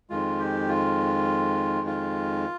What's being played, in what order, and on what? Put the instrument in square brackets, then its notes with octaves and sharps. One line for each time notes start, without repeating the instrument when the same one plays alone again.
[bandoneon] F2 D#3 G#3 F4
G4
F4
F4